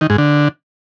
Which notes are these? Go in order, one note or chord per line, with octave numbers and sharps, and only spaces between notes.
D#3
G#2
D3